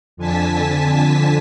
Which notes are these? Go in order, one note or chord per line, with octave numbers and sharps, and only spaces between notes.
F2 D3 G#5 A5 B6